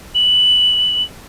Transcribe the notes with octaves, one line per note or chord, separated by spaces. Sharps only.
F#7